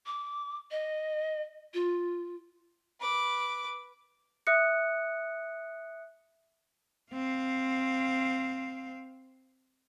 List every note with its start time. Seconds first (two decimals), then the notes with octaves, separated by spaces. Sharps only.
0.06 D6
0.71 D#5
1.74 F4
3.00 B4 D6
4.47 E5 D#6 F#6 C#7
7.12 C4 F5